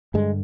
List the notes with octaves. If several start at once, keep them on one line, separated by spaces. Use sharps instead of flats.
G2 D3 G#3